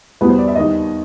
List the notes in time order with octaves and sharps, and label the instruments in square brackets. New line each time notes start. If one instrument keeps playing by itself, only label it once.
[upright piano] E2 B2 G3 B3 B4
C5
D5
E5
D#2 D#3 G3 D#5